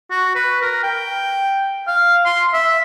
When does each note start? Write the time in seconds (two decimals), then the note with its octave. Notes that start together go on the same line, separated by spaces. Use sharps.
0.11 F#4
0.35 B4
0.62 A#4
0.83 G5
1.87 F5
2.25 C6
2.54 E5